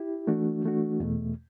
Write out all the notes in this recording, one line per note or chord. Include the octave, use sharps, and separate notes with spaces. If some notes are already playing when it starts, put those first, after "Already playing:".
Already playing: E4 G4
E3 A3 D4 F#4
E3 A3 D4 F#4
E2 B2 A3